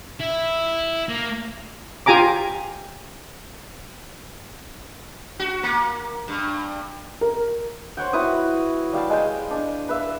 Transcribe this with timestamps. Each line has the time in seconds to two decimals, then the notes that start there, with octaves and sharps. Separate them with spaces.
0.20 E4
1.09 A#3
2.06 F4 G4 G#5 A#5 D6
5.40 F#4
5.63 A#3
6.28 G2
7.21 A#4
7.97 C5 C#5 F#5 G5
8.13 E4 F#4 B4 D#6
8.93 G3 F5 G5 A5
9.10 G#3 G5
9.50 D4 G#5
9.89 B4 E5 F5